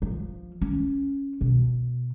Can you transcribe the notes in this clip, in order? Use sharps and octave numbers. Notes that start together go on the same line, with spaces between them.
F3
C#4
B2